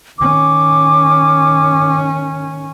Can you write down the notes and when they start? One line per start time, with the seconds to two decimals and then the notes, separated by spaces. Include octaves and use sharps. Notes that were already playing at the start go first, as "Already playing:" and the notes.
0.19 D#3 C#4 D6